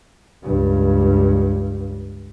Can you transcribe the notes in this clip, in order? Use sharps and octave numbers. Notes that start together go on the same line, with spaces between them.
C#2 G2